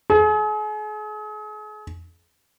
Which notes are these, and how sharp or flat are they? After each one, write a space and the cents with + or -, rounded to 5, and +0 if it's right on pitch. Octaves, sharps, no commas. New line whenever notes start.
G#4 +40